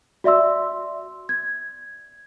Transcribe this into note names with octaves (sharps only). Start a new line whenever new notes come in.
F#4 D5 E5 C6 E6
G#6